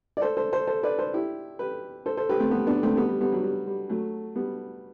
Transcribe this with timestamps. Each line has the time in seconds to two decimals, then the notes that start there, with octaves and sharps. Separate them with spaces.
0.17 D5
0.21 A4 C5
0.37 A4 C5
0.53 A4 C5
0.67 A4 C5
0.83 B4 D5
0.98 A4 C5
1.14 E4 G4
1.59 G4 B4
2.06 A4 C5
2.17 A4 C5
2.29 G4 B4
2.40 A3 C4
2.51 G3 B3
2.67 B3 D4
2.83 A3 C4
2.97 G3 B3
3.09 G3
3.21 G3 B3
3.32 F#3
3.44 G3
3.67 G3
3.89 F#3 A3
4.36 G3 B3